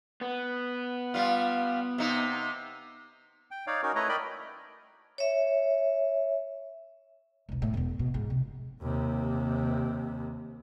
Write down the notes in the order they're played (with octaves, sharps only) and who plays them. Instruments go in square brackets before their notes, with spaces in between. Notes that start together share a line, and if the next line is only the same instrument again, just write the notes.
[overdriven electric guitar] B3
[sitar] G3 F4
C3 D#4
[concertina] G5
D#4 C#5 D5 F5
C#4 D#4 F#4 A#4
A3 E4 B4 C#5 D#5 A#5
A#4 D5 D#5 G5 B5
[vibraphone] C#5 E5
[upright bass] E1 B1
A2
E1 E2
B2
G#2 F3
C3
[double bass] D#2 C3